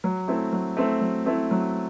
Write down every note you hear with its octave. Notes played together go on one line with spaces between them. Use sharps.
F#3
A3 C4 E4
F#3
A3 C4 E4
F#3
A3 C4 E4
F#3